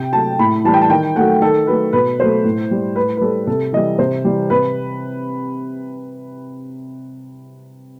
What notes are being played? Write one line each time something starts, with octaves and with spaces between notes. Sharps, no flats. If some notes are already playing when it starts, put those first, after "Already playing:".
Already playing: C3 G5
F#3 A3 A5
A2 B5
E3 G3 A5
G5
A5
D#3 G5
F#3 A3 F#5
D#3 A4
F#3 A3 B4
B2 B4
F#3 A3 C5
A2
G3
A2 B4
B4
G3 A4
C3 A4
E3 G3 D#5
C3 C5
E3 G3
C3 B4